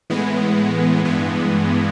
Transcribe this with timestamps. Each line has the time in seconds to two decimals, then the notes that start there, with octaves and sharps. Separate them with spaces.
0.10 A2 E3 G#3 B3
1.04 G2 E3 G#3 B3